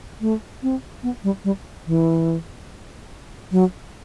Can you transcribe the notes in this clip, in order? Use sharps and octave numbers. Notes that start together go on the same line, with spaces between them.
A3
C4
B3
G3
G3
E3
F#3